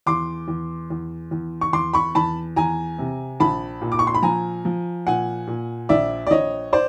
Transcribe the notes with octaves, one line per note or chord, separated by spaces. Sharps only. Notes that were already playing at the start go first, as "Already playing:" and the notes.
E2 C6 D6
E2
E2
E2
C#6
E2 C6 D6
B5 C#6
E2 A5 B5
E2 G#5 A#5
C3
A#1 A5 B5
A#2
D6
C#6
C6
B5
F3 G#5 A#5
F3
A#2 F#5 G#5
A#2
A#1 D5 E5
D5
A#1 C#5 D#5
C5 D5